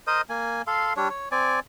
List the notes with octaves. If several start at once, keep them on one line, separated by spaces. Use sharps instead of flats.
A#4 C5 D#5 D#6
A#3 G#5
A4 F5 C6
G3 D4 C#5
C#5
C4 D5 G#5